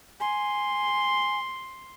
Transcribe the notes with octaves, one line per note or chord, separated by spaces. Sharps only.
G#5 C6